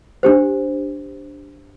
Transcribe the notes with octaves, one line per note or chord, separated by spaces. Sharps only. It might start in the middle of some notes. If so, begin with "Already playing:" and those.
D4 G4 C5